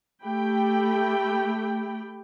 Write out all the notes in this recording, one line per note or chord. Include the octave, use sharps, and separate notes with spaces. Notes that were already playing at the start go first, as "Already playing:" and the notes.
A3 G4 G5 B5